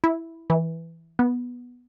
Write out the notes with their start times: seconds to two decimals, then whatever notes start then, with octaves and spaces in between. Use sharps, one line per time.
0.04 E4
0.50 E3
1.19 B3